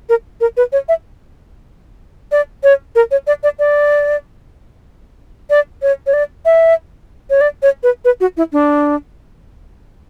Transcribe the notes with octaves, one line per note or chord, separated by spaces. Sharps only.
A#4
A#4
B4
C#5
E5
D5
C#5
A#4
C#5
D5
D5
D5
D5
C#5
C#5
D5
E5
C#5
D5
C#5
B4
B4
F#4
E4
D4